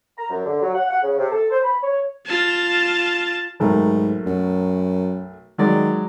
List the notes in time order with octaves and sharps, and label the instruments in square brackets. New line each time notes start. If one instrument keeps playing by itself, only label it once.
[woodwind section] A#5
F#2
D3
F#3
F#5
F#5
C#3
C3
A4
C5
B5
C#5
[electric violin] F4 A5
[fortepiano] B1 A3 A#4 [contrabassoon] G#2
[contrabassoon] F#2
[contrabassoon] D#3 [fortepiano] F#3 G#3 D5